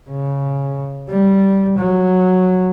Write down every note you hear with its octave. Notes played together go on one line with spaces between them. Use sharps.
C#3
G3
F#3